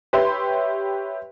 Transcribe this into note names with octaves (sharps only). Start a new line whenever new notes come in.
G4 B4 C#5 E5 C6